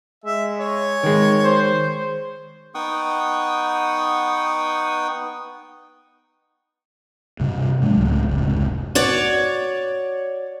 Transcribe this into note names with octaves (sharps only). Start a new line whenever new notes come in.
G#3 E5
C#5
D#3 G#3
C5
B3 D#4 F#5 G5 C#6 D#6
G2 C3 A#3
G#2 F#3 G#3 D4
C#2 A2
F1 C#2 G#2
F#4 C#5 D5